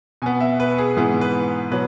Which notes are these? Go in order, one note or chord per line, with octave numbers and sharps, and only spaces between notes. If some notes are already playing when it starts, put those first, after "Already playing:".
B2 B3 G#5
E5
B4
G#4
G#2 E3 B3 G#4
B4
B2 F#3 B4